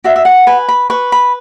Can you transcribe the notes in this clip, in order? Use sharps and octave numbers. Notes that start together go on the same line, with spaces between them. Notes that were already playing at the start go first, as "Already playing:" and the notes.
F#4 E5
E5
F#5
B4 G#5
B5
B4 C#6
B5